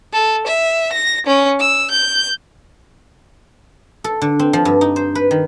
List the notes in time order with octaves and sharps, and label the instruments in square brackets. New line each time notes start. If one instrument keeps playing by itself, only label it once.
[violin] A4
E5
A#6
C#4
E6
G6
[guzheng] A4
D3
C4
F3
G2
D#4
C5
B4
D#3